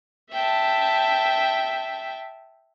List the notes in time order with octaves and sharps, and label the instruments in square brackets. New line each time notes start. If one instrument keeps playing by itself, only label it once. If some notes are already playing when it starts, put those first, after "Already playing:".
[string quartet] E5 G5 A5